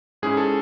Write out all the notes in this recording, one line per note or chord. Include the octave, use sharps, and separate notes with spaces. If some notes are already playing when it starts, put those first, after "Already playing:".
G#2 G#3 C#4 E4 G#4
A4